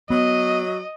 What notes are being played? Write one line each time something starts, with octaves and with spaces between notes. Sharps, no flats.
F#3 B3 D#5